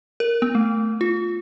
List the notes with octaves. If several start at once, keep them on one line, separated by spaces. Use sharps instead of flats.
A#4
B3
A3
F4